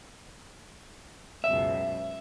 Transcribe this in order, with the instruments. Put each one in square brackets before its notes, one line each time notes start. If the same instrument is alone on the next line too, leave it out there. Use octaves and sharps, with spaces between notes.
[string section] C#2 F#2 B2 [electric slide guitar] E5